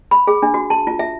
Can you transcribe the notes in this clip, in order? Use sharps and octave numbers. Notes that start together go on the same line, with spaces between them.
B5
G#4
D4
F#4
A5
F4
E5